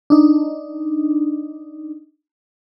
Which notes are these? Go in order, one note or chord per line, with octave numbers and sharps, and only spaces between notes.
D4 D#4